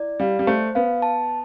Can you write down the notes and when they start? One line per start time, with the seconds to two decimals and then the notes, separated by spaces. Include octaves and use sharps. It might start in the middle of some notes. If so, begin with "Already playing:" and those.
Already playing: E4 D5
0.20 G3 F5
0.39 G3
0.47 A3 C5
0.75 B3 F5
1.02 A5